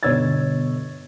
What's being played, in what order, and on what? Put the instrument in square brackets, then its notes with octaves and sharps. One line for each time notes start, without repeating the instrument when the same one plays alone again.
[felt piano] G1 B2 C#5 E6 G#6 A6